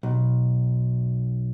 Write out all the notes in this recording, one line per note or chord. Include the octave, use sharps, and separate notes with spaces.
B1